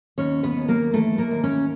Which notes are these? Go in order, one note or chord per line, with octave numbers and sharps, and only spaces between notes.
D#2 C#4 C#5
B3 B4
D#2
A#3 A#4
E3 A3 A4
A#3 A#4
D#2
C#4 C#5